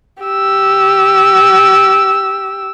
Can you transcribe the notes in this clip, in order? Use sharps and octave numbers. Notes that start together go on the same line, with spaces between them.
G4 E6